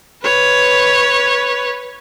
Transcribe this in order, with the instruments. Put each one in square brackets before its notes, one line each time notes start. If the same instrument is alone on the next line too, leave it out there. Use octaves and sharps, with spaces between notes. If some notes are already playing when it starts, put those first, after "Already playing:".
[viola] B4 C#5